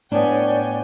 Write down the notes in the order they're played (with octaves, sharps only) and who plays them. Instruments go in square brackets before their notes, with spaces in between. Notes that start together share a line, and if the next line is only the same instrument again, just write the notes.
[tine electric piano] A2 B3 [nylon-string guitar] D4 [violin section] C#5 G5 G#5 [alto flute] D5